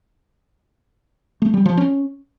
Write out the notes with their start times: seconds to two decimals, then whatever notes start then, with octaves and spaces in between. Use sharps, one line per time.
1.42 A3
1.54 G3
1.66 F3
1.77 C#4